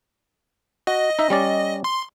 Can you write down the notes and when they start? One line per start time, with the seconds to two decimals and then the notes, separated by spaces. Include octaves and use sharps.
0.87 F#4 D#5
1.19 D#4 E5
1.30 G3 C#4 D5
1.84 C6